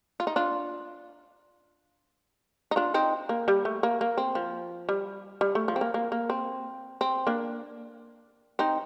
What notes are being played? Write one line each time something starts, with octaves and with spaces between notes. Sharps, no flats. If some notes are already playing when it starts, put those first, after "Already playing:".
F4
D#4
D4 F4
D#4
D4 F4
C4 D#4
A#3
G3
A3
A#3
A#3
C4
F3
G3
G3
A3
F3
C4
A#3
A#3
A#3
C4
C4
A#3 D4
C4 D#4